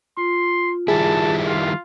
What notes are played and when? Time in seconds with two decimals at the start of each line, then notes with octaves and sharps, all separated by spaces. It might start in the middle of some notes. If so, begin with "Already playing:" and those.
0.17 F4 C6
0.88 D#3 G3 E4 G#4 A5
1.47 F4